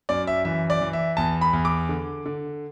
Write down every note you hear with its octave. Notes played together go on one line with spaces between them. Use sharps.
F#2 D5
E5
E3 E5
D5
E3
E5
E2 A5
B5
E2
D6
D3
D3